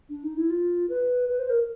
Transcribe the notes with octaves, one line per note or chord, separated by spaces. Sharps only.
D4
D#4
E4
F4
B4
B4
C5
A#4